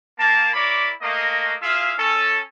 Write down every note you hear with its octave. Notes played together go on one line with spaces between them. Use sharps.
A#3 A5
E4 A#4 C#5 D5 B5 D6
A3 A#3 D#5
E4 F4 G#4 E5 F5
C#4 A4